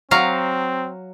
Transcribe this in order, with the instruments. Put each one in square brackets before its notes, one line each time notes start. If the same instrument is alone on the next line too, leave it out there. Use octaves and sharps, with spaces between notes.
[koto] F#3 F5 A#5 [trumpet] C4